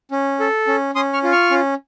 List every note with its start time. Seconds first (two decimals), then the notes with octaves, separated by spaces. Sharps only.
0.11 C#4
0.40 A4
0.67 C#4
0.95 C#4 C6 D#6
1.13 C#6 F6
1.23 F4
1.32 C#6 F6
1.51 C#4